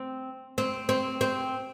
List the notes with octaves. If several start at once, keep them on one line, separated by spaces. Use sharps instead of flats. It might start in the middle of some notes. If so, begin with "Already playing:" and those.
Already playing: C4
C4
C4
C4